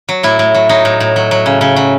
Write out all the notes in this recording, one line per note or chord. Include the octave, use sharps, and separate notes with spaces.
F#3
A2 E4
A2
F#3
F#3 D#4
A2
A2
F#3
F#3
C#3
C#3
F#3